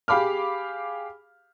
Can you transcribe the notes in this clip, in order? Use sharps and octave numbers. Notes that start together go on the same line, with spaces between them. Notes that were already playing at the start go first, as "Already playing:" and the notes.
G4 G#4 F5 B5 D6 F6